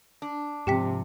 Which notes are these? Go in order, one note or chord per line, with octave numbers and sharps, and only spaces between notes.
D4
G#2 C3 F3 G4 G5 B6